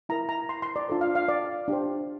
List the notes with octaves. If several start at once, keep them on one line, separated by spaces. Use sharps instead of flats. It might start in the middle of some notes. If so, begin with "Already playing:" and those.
E4 A#4 A#5
A#5
C6
C6
D5
D4 F4 A4 C5
F5
F5
D5
D4 G4 C5